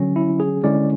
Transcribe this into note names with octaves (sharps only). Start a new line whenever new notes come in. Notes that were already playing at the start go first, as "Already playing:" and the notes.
Already playing: D3 F#3 C#4
E4
G#4
D3 G#3 C#4 E4 D5